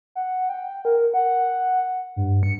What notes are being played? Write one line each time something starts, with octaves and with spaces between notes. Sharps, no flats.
F#5
G5
A#4
F#5
G2
C#7